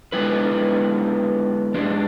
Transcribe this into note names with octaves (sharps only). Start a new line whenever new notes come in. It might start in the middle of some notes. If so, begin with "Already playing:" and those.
D3 G#3 B3 E4 B4
G#2 G#3 D4